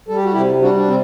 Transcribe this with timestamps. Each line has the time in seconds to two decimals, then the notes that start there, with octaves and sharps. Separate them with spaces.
0.09 G3 A4
0.16 G4
0.24 F#4
0.33 C3 E4 G4
0.62 G3 D4 F#4
0.77 D4
0.88 C3 C4